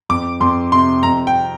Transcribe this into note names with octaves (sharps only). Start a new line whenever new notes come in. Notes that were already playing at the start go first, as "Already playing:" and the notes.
F2 D6
F2 C6
C3 C6
F2 A#5
G5